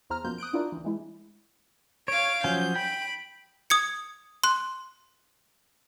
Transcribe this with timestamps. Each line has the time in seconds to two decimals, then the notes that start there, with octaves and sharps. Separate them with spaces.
0.10 E2 C5 A#5 F6
0.24 F#2 B2 F3 A#3 C5 G6
0.38 D#6 F#6 G6 D7
0.53 D4 E4 F4 A#4 D5
0.72 D2 E3
0.84 E3 G#3 E4
2.08 C#5 F5 D7
2.44 F3 F#3 C#4 G6
2.75 G5 B5 D7
3.70 D#6 G#6 C#7
4.44 C6 F#6